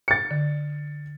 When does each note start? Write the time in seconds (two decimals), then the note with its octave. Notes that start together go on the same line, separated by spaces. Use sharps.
0.08 A6 C#7
0.31 D3